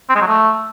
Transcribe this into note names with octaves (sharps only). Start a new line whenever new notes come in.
C4
G#3
F#3
A3